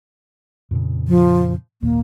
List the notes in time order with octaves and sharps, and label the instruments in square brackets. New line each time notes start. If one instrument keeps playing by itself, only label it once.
[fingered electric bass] F2 A#2 C#3
[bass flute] F3
[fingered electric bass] G#1 D#2 A#2 [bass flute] A#3